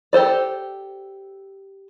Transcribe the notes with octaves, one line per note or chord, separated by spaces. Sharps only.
G4 A4 C5 D5